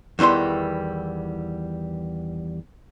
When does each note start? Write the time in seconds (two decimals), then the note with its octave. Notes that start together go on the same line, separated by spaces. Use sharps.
0.19 E2 D#3 E3 G3 C6